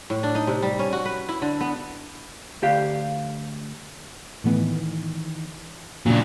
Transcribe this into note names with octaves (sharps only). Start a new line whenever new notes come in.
A2
D4
D#4
C3
G3
C#4
F#4
B4
E4
D3
B3
D2 G4 F5
A2 D#3 E3 A3 B3
A#2 C#3 F#3 C#4 D4